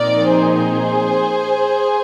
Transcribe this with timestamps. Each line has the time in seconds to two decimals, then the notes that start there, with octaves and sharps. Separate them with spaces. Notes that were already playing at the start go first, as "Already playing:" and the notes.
Already playing: A#2 F3 C4 D#4 A#4 D5
0.30 G#4 C5